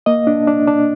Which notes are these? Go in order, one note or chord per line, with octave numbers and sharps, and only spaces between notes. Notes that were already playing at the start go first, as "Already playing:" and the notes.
A#3 D#5
D4
D4
D4